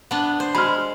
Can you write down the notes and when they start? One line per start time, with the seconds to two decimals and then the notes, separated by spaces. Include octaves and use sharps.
0.11 B3 D4
0.40 C5
0.55 G#3 B5 F6